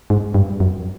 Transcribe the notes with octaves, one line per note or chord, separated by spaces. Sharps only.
G#2
G2
F#2